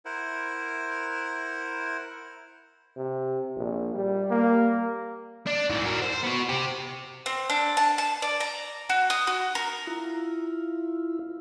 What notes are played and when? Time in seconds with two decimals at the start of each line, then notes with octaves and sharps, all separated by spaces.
0.05 E4 A#4 C5 F#5
2.97 C3
3.56 A#1
3.95 G3
4.30 A#3
5.46 D4
5.69 G#2 E3
5.85 F#4 A#4
6.02 C5
6.23 B3 F#4
6.49 C4 G4
7.26 C4
7.50 D4
7.77 A5
7.98 A5
8.22 D5
8.40 A#5
8.90 F#4
9.10 D#6
9.27 F#4
9.55 A#4
9.87 E4 F4